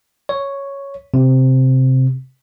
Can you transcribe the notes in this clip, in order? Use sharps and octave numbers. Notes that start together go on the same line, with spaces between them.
C#5
C3